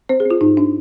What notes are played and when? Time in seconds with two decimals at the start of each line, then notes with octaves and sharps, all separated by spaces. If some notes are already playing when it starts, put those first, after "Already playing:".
0.09 C4 C5
0.20 G#4
0.26 C4 F4
0.41 G#2 D#4
0.57 D4